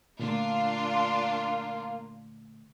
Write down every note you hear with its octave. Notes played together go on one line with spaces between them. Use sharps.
A#2 D3 A3 A#3 D4 F4